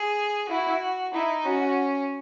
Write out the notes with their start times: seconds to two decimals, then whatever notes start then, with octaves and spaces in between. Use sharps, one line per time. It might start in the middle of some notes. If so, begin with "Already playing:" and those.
Already playing: G#4
0.49 E4 F#4
1.13 D#4 E4
1.45 C#4 F#4